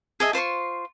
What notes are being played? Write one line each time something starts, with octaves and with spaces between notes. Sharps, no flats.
G#4 D#5 E5
F4 C5 C6 C#6